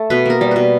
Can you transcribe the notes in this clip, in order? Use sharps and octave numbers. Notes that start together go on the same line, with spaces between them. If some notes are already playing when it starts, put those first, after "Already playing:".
Already playing: A3
B2 B4
A#3 A#4
G3
B2 B4